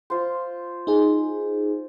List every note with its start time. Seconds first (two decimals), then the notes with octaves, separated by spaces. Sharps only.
0.10 F4 C5
0.87 D#4 G#4